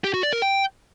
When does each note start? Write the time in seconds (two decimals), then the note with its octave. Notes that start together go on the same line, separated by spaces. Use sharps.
0.04 G4
0.14 F#4
0.23 D5
0.33 A#4
0.42 G5